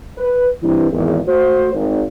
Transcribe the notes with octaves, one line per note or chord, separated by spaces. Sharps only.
B4
G2 E3 C4 E4
G#1 E2
A3 F#4 C5
G#1